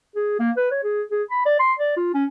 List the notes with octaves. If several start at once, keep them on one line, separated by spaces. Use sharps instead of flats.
G#4
A#3
B4
C#5
G#4
G#4
B5
D5
C6
D5
F4
C#4